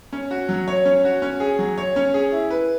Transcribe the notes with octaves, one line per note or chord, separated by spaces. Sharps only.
C#4
F#4
F#3
C#5
C#4
F#4
C#4
G#4
F#3
C#5
C#4
G#4
E4
B4